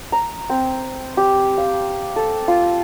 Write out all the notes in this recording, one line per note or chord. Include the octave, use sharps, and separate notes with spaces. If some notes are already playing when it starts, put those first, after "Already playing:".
A#5
C4
G4
F5
A4
F4